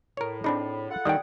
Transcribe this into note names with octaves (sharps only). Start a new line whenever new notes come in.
A2 A#4 C#5
C4 D4 D#4 G#4 B5
F4 A4 F#5
D#3 G3 D5 G5 D#6